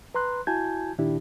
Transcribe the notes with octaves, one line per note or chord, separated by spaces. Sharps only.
B4 A#5 C6 F#6
E4 F#4 G#5 A5 G6 G#6
A#2 D#3 D4 E4 G4